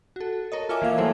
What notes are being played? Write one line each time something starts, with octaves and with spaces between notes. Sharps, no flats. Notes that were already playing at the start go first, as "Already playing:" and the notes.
F#4 A4
A4 A#4 C#5 D#5
F4 C#5 E5 G#5 D6
E3 A#3 F5 G#6
F#3 G3 A3 E4 A4 C5